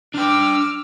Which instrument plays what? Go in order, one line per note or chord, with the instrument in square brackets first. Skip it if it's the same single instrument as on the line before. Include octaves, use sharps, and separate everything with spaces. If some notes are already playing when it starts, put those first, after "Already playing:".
[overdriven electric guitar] D4 G5 [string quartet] D6 E6 F6